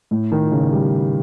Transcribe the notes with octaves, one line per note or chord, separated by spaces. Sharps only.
A2
D#3
C#3
G3